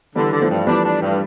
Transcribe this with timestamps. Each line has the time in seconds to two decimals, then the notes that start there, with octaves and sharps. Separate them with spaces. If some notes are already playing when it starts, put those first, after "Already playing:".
0.15 D3 E3 G3
0.33 D3
0.41 F3 A3
0.49 G2
0.67 E3 G3 D4
0.85 D4
1.01 G2